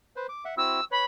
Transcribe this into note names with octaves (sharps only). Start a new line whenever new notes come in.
B4 C5
D6
E5 F#5
C4 E4 F#4 E6
B4 C#5 B5